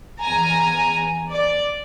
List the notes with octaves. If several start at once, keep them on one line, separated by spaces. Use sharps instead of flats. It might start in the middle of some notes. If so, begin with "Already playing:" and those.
E2 G#5 A#5
D5